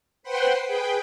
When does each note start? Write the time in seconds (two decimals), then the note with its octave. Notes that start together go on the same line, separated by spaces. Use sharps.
0.23 B4 C5 F#5 G5 C6
0.65 G#4 B4 G5